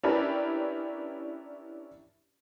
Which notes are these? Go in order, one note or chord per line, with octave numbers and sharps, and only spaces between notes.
C#4 D4 E4 G4 A#4 B4